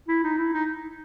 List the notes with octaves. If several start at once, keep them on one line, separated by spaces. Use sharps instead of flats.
E4
D#4
E4
D#4